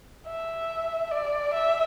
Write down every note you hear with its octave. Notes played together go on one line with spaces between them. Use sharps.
E5
D5
E5